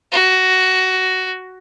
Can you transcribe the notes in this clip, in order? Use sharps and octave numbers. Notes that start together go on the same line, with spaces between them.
F#4